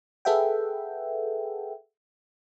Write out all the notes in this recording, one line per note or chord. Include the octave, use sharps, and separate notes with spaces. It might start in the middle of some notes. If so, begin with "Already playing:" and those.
G#4 A4 B4 E5 F#5 G5